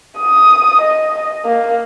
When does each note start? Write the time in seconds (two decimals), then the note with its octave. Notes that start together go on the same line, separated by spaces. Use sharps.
0.17 D#6
0.81 D#5
1.45 A#3